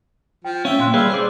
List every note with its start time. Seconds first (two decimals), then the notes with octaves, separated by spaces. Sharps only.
0.45 F3 G5
0.65 C#4 E5 F5 G5
0.79 A#2 F5 C6 F#6
0.94 G3 G#4 B4 C#5 F5 E6 F6
1.10 G#4 C5 D5